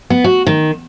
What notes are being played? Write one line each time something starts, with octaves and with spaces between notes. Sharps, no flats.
B3
F#4
D#3